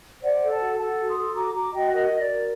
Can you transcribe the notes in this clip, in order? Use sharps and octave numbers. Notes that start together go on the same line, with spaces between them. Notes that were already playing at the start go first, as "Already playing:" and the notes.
C5 D5 F#5
A4
F#5 A5
F#4
A4 F#5 A5
F#4
C6 D#6
A4
F#4 A#5 D6
F#4 A#5 D6
F#4 D#5 G5
A#4 D#5
F#4
D5
A#4